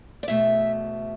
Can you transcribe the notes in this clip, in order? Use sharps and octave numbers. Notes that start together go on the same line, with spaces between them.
D5
E2 B2 A3 E5